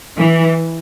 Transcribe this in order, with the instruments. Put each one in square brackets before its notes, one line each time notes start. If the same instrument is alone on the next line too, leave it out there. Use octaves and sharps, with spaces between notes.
[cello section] E3